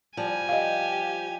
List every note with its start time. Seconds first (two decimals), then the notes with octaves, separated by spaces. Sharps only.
0.17 F3 G3 G#5
0.49 G4 D#5 F5